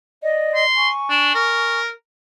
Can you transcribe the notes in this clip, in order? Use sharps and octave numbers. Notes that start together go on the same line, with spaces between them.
D5 D#5
C6
G#5 C#6
D4
A#4